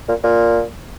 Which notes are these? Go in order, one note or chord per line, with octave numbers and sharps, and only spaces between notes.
A#2
A#2